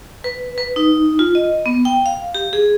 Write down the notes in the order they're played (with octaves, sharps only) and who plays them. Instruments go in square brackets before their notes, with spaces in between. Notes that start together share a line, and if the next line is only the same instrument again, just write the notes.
[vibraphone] B4
B4
D#4
F4
D#5
B3
G5
F5
G4
G#4